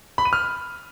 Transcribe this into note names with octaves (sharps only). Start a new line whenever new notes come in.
B5
D#7
F6